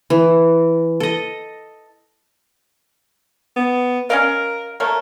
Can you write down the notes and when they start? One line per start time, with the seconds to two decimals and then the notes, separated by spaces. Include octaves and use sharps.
0.10 E3
1.00 A4 D#5
3.56 B3
4.10 C#4 A#4 D#5 F5
4.80 A3 A#3 A#4 C#5